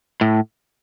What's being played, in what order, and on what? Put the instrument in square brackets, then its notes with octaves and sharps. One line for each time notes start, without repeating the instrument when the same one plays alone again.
[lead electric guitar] A2